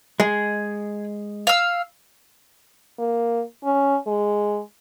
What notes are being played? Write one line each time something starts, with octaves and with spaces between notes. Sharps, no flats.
G#3 G#4
F5 E6
A#3
C#4
G#3